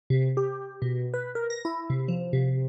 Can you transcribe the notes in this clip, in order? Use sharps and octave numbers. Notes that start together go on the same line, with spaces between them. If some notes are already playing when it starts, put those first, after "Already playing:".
C3
G4
B2
B4
A#4
A#6
E4
C3
F3
C3